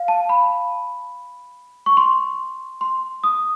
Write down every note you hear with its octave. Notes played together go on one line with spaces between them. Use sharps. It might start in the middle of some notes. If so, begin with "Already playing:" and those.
Already playing: F5
A5
B5
C#6
C6
C6
D#6